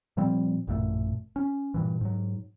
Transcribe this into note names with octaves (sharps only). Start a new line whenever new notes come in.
A#2 F3 G3 C4
A1 F#2 A#2 A3
C#4
G2 A#2 E3
G#2 F#3